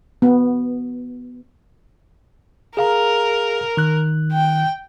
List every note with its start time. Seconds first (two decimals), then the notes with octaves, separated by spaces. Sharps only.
0.22 B3
2.77 G#4 A#4 F5 A#5
3.77 D#3 F#6
4.32 G5